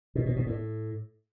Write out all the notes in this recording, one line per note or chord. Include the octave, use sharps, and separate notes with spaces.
B2
B2
B2
A2